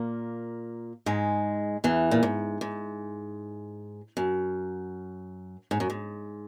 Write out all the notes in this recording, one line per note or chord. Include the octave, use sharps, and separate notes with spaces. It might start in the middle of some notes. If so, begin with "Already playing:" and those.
Already playing: A#2 A#3
G#2 G#3
E2 E3
A#2
G#2
G#2
F#2
G#2
F#2
G#2